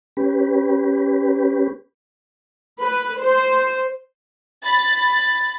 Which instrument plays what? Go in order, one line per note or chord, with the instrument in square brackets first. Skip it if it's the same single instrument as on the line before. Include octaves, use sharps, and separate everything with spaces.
[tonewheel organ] C#4 G4 B4
[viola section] B4
C5
[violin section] B5 A6